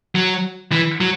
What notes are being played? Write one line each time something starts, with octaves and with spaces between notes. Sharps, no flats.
F#3
E3
F#3